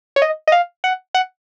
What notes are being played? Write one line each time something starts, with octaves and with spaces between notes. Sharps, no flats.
C#5
D#5
D#5
F5
F#5
F#5